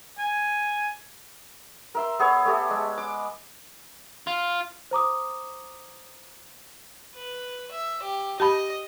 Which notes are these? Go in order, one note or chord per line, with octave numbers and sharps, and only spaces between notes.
G#5
A#4 E5 C6
B3 G#4 C#5
A3 G4 A4
G#3
D6
F4
C5 A#5 D6 D#6
B4
E5
G4
G4 D#5 A5 B5